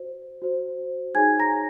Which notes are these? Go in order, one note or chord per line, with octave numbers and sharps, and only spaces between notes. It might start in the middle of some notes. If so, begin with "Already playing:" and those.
Already playing: F#4 C5
F#4 C5
D#4 G#4 C#5 G#5 G#6
A#5 A#6